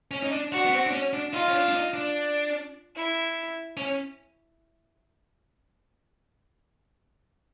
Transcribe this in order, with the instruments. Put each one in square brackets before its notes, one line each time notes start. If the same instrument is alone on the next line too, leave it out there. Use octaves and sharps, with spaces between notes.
[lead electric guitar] C#4
D#4
D4
[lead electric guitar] D4 [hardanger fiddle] F#4
[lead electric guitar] B3
C4
D4
C#4
D4
[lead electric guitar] D#4 [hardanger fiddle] F4
[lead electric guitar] C#4
D4
D4
D#4
D4
[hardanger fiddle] E4
[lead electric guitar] C#4